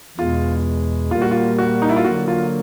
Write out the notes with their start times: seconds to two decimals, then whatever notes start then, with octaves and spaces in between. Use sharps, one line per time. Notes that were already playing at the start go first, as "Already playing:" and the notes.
0.18 E2 B2 G#3 F4
1.11 A#2 G3 A#3 F4
1.22 F#4
1.31 F4
1.58 F#4
1.82 D#4
1.89 E4
1.96 F4
2.04 D3 F#3 A#3 F#4
2.28 F4